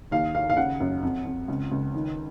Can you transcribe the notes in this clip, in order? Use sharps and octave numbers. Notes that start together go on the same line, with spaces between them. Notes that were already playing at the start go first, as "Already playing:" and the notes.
D#2 F5
D#3 F5
F5
C#3 F#5
F#2
F2
F2
C#2
C#2
D#3